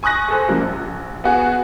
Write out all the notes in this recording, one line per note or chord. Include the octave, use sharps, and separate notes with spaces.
G#5 C#6 D#6 F#6 A#6
G#4 A4 C5
C#3 F3 G3 G#3 A#3
A#1
B3 F#4 G#4